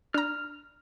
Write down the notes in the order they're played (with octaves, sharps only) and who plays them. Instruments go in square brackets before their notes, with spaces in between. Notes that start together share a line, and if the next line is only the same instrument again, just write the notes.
[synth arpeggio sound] D4 A#5 [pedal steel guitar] F6